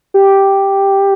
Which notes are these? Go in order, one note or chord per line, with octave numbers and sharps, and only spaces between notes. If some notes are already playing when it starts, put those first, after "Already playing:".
G4